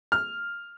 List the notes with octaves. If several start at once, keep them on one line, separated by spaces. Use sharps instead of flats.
F6